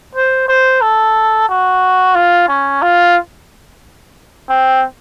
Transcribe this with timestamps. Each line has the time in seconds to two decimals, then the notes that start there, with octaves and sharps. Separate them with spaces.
0.15 C5
0.48 C5
0.81 A4
1.49 F#4
2.15 F4
2.49 C#4
2.82 F4
4.49 C4